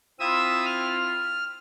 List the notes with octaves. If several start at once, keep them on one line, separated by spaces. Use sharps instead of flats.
C4 E4 F4 E5 D#6 E6
F6